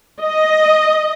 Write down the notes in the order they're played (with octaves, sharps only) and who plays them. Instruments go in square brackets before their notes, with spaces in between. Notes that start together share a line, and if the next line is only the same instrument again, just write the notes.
[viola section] D#5